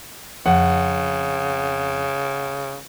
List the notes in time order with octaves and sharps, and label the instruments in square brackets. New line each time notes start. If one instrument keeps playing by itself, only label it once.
[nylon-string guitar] F2 [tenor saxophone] C#3 [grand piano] F#5